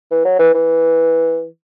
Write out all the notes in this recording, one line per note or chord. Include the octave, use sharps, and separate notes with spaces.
E3
F#3
E3
E3